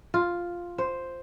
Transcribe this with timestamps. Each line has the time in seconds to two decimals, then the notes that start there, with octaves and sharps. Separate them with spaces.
0.14 F4
0.78 C5